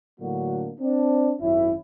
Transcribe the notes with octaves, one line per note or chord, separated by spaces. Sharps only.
A2 D3 F#3 A#3 D4 F#4
C4 D4
G#1 F#2 C#4 E4